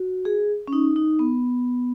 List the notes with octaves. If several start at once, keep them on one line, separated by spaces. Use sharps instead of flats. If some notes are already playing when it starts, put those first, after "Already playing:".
Already playing: F#4
G#4
C#4
D#4
D#4
B3